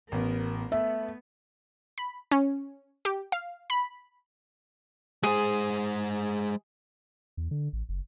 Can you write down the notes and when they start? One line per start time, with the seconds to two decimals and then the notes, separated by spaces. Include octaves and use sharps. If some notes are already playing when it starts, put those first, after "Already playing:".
0.12 A1 B3 A#4
0.72 A3 B3 E5
1.98 B5
2.31 C#4
3.05 G4
3.32 F5
3.70 B5
5.23 G#3 G#4 C5
7.37 E2
7.51 D3
7.73 A1
7.89 F#1